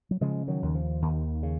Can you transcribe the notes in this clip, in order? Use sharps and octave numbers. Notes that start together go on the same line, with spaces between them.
F#3
C#3 F3 G#3
D#3 F#3
D#2 D#3
F3
D#2 D#3
C#3